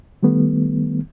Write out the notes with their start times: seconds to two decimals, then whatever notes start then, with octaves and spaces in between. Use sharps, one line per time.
0.23 D#3 G3 A3 B3